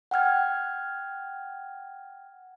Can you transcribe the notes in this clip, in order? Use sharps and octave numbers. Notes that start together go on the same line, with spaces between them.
F#5 G5 F6 G#6